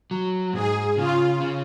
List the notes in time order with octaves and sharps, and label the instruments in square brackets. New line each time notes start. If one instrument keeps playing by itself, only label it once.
[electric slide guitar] F#3
[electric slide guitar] G#2 [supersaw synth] G#4
[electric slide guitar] C#3 [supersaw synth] F4
[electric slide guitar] C#4